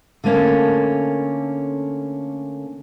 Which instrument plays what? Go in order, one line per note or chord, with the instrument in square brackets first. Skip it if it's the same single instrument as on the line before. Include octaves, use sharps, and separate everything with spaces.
[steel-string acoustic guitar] D3 A3 A#3 C#4